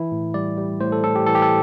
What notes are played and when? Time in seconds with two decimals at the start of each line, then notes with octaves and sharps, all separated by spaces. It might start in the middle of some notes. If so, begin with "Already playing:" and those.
Already playing: E3 E4
0.12 A2
0.34 G3 D5
0.58 G3
0.80 A2 C5
0.92 A4
1.04 A2 A4
1.15 G4
1.26 E3 A4
1.35 G4
1.42 A4